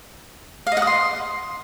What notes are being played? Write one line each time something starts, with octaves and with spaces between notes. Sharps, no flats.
F5
D#5
F#5
D#6
C6